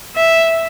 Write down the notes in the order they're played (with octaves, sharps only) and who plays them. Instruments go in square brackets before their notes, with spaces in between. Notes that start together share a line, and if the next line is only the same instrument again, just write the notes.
[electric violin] E5